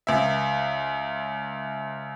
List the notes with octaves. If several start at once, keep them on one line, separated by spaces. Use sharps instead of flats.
C#2 E5